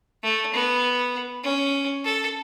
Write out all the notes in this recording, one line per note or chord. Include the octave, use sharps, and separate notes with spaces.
A3
B3
C#4
A4